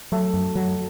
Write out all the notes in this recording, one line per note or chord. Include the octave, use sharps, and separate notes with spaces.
F#3 A3
F#2
F#3